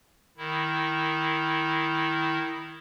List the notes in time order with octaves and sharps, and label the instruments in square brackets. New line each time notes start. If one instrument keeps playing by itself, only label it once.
[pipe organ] D#3 E4